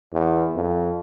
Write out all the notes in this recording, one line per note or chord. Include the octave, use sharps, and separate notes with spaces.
E2
F2